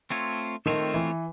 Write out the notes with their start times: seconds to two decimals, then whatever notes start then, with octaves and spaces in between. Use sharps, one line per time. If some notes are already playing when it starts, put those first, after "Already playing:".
0.10 A3 C4 F4 A4 C#5
0.66 D#3 A3 C4 F4 A4 C#5
0.94 E3